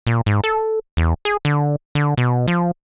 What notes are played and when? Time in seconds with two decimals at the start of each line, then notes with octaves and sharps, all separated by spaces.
0.07 A#2
0.26 G#2
0.44 A4
0.97 E2
1.25 G#4
1.45 D3
1.95 D3
2.18 B2
2.48 F3